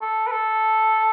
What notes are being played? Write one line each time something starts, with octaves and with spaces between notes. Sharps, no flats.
A4
B4
A4